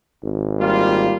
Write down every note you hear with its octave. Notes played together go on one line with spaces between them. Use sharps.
G#1
G3 A#3 F4